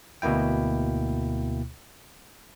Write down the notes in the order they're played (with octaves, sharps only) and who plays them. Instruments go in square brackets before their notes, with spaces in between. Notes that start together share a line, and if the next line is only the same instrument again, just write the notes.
[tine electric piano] D2 B2 A#3 E4 G5